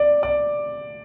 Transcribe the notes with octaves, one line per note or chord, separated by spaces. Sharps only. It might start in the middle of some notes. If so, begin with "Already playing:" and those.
Already playing: D5
D5